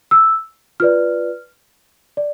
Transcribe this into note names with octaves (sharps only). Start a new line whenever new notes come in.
E6
F4 B4 D5 F6
D5